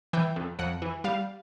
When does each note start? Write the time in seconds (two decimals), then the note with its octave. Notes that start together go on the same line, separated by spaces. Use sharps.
0.13 E3 G5
0.36 F2
0.59 F2 F#5
0.82 E3
1.04 G3 F5